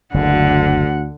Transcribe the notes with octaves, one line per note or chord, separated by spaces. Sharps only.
F#1 D2 D3 F#5